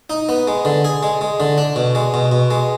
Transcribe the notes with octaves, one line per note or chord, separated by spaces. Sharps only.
D#4
B3
G#3
D3
G#4
G#3
G#3
D3
D4
B2
G#3
B2
B2
G#3